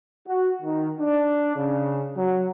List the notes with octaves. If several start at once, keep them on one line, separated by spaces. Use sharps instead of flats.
F#4
D#3
D4
C#3
F#3